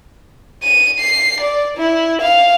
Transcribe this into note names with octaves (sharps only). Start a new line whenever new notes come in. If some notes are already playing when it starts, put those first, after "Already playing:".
D#7
C7
D5
E4
F5